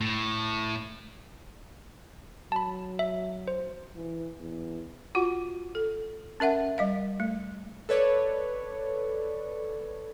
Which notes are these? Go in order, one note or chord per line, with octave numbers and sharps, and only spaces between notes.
A2
F#3 A5 B5
E5
C5
E3
E2
F4 F#4 F#5
A4
C#4 A#4 E5 F#5
G3 D#5 F5
A3
A4 B4 C#5 D5